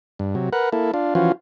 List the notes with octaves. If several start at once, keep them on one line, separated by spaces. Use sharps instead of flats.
G2
C3 F#3
A#4 B4 F#5
A#3 E4 A4
D4 F4
E3 F3 C#4 F4 F#4